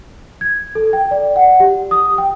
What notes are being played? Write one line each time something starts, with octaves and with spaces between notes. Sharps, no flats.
G#6
A4
G5
D5
F#5
G4
D#6
G5